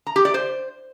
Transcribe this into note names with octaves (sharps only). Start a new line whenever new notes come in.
A#5
G4
D5
C5